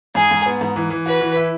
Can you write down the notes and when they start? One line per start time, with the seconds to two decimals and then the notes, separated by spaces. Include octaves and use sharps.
0.15 G#2 G#4
0.31 G#2
0.46 B3
0.61 G#2
0.76 E3
0.90 E3
1.06 F#4 B4
1.21 E3
1.36 E4